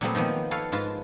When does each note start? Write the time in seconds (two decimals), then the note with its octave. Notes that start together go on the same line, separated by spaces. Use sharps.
0.01 A#2 F#3 G3 A3 B3 C4
0.15 D#3 F3 A#3 B3
0.51 A4 B4 C#5 F5
0.72 G#2 F4 B4 A5